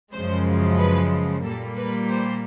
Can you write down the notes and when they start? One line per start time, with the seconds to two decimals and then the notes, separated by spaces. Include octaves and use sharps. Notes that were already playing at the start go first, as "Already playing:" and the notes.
0.13 F#2 C#3 F3 G#3 C5
0.78 B4
1.44 A#2 G3 A#3 A4
1.77 B4
2.09 C5